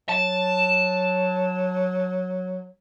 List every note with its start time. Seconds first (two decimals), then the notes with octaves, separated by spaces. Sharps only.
0.09 F#3 A5